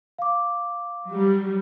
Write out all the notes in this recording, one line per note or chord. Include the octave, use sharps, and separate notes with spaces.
F5 D6
F#3 G3